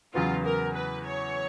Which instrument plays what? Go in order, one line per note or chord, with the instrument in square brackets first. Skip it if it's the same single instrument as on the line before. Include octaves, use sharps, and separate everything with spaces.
[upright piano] E2 C#3 F#3 B3 [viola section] F4
[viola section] A#4
B4
C#5